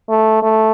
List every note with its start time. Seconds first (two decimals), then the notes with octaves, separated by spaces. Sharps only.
0.09 A3
0.43 A3